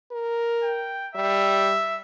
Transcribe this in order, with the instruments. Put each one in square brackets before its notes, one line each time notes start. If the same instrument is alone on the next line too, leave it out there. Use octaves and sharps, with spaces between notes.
[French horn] A#4
[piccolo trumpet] G5
[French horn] G3 [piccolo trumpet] E5